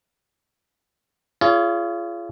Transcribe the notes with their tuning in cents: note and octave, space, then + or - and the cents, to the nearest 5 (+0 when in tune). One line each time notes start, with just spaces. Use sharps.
F4 -30 G#4 +20 C#5 +45